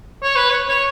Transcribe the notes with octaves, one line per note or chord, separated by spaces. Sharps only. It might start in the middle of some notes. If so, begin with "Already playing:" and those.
C#5
B4
C#5
C#5